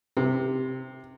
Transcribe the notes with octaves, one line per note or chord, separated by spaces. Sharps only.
C3